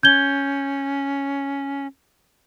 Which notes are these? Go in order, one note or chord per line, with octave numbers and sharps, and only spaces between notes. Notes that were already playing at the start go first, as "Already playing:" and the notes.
C#4 G6 G#6 G7